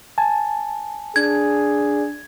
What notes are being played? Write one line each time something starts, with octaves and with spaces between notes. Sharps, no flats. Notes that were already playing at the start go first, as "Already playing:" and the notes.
G#5 A5
D4 G#4 G#6